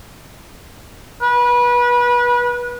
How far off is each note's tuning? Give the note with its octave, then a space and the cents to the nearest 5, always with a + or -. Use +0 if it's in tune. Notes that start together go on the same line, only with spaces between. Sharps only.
B4 -25